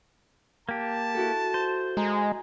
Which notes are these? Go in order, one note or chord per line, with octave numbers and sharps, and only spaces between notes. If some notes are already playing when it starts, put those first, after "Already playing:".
A#3 G4 A5
E4 F#4 A4
C5
G#3 A#5